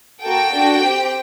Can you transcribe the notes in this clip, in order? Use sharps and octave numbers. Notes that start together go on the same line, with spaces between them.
A#3 F#4 A4 G5
D4 F#4 A4
C4 G4